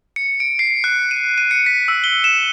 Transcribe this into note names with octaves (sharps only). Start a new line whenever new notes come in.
C#7
D7
C7
F#6
D#7
D#7
C#7
B6
E6
G7
E7